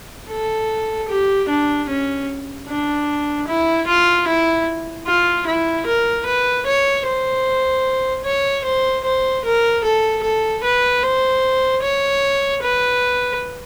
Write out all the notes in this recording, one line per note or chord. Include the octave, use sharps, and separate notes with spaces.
A4
G4
D4
C#4
D4
E4
F4
E4
F4
E4
A#4
B4
C#5
C5
C#5
C5
C5
A#4
A4
A4
B4
C5
C#5
B4